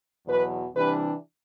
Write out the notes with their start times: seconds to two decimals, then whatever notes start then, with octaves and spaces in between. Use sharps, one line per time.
0.27 E2 B2 F#3 B4
0.75 C3 E3 G3 D4 B4